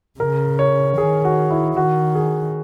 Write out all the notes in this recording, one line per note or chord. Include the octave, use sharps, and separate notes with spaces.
C#3 A#4
C#5
D#3 G#4
F#4
E4
D#3 F#4
G#4